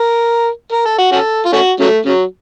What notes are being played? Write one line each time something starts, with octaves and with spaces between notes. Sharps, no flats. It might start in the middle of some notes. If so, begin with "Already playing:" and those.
Already playing: A#4
A#4
A4
F#4
C#4 F#4 A4
F4
A3 C#4 F#4
C#3 F#3 A3
C#3 F#3